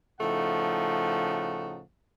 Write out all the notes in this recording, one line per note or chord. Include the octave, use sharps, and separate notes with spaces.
A2 C#3 F3 A3 D#4 F#5